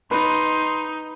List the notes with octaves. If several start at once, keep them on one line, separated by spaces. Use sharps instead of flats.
D#4 B4 C6